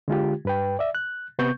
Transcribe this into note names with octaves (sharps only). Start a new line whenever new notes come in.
D3 G#3 F4 G4
G2 B4 G5
D5 E5
F#6
C3 B3 C#6 G6